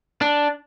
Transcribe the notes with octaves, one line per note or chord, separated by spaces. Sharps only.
D4